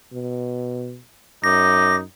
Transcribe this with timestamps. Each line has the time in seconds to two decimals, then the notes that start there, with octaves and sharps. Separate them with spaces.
0.13 B2
1.44 F#2 D#4 D6 A#6